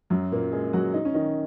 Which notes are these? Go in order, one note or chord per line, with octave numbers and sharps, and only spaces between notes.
F#2 F#3
A#2 A#3
G#3 G#4
F#3 F#4
D#4
C#4
D#3 D#4